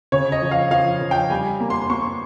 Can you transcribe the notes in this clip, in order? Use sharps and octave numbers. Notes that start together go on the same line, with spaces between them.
C#3 C#5
D#5
F3
F5
F3 F5
F3
G5
G3 G#5
A#3
C6
C6
A#3 C#6